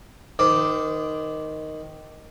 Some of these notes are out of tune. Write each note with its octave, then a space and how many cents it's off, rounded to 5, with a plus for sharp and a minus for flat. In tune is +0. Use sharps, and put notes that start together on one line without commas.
D#3 +0 C5 -35 D6 +0